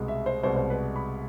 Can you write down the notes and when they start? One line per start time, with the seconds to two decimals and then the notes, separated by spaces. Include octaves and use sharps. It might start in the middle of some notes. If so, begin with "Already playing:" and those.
Already playing: C2 B2 G#3
0.08 E5
0.26 C5
0.43 C2 B2 G#3 C5
0.56 C5
0.70 B4
0.96 B5